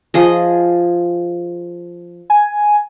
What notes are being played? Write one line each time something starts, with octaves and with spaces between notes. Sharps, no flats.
F3 G#4 D#5
G#5